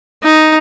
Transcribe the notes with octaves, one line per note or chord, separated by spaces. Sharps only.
D#4